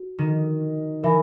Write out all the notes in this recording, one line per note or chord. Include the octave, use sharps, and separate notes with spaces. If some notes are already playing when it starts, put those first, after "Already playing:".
Already playing: F#4
D#3
E3 A#4 E5 G#5 B5